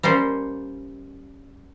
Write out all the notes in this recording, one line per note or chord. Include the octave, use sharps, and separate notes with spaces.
G3 A#3 C#4 C5